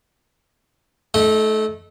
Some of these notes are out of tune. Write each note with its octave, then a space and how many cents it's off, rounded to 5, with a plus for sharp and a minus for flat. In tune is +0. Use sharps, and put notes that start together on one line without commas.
A3 -25 D#4 +5